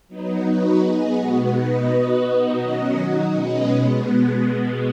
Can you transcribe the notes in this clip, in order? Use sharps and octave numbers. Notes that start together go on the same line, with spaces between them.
F#3 B3 D#4
F#3 D#4 F#4 B4
B3 G#4 D#5
B2 G#3 B3 F#4
B2 B3 D#4 B4 D#5
B3 F#4 B4 D#5
B2 B3 D#4 F#4 D#5
D#3 F#3 C#4 F#4 D#5
F#3 D#4 F#4
B2 G#3 C#4 B4 D#5
B2 G#3 B3